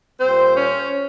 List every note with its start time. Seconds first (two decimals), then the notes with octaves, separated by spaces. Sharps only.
0.20 A#2 G3 C4 C5
0.57 C#4 C#5